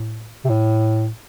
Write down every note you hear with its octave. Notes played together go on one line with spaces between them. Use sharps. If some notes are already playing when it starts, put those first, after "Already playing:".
Already playing: A2
C3
A2